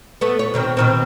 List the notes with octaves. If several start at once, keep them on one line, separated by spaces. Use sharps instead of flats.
A3 B3
C#5
B2 D#3 C4
B2 D#3 C4